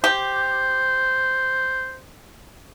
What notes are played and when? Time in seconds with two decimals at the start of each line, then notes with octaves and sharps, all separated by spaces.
0.04 G4 C5